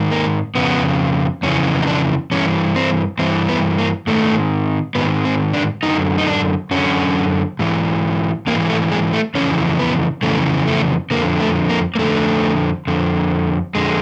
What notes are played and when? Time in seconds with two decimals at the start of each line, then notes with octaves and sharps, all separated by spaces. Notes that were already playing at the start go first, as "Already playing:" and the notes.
Already playing: G#2 D#3
0.11 A#3
0.55 F2 C#3 B3
1.43 F2 C#3 E3 C#4
1.82 D#4
1.87 D4
2.31 G2 E3 C#4
2.76 C4
3.19 G2 E3 C4
3.49 B3
3.78 A#3
4.07 G#2 D#3 A3
4.95 G#2 D#3 B3
5.25 C4
5.53 D4
5.83 F#2 D3 D#4
6.18 D#4
6.27 D4
6.71 F#2 D3 C#4
7.59 G#2 E3
8.47 G#2 E3 A#3
8.69 A3
8.92 G#3
9.13 A3
9.35 F2 C#3 E3 C#4
9.79 B3
10.23 F2 C#3 E3 A3
10.67 A3
11.11 F2 D3 A#3
11.40 A3
11.69 A#3
11.95 A#3
11.99 F2 D3 A3
12.87 F2 D3
13.75 F2 D3 G#3